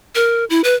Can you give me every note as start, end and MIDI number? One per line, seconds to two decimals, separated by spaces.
0.15 0.45 70
0.50 0.61 64
0.64 0.74 71